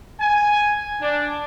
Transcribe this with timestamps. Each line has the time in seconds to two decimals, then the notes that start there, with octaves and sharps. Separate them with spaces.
0.21 G#5
1.02 D4